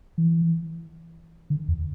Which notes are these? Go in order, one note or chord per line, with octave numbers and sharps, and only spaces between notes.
E3
D3
E2